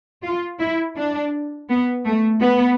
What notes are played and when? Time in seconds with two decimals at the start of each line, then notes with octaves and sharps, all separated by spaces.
0.23 F4
0.60 E4
0.96 D4
1.69 B3
2.05 A3
2.41 B3